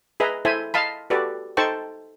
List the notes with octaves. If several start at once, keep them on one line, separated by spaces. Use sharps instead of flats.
G#4 B4 D#5 E5 A#5
E4 A4 C5 E5 G#5
D#5 F5 A5 B5
F#4 G4 A4 B4 D5
D#4 A4 C5 G5 A5 C#6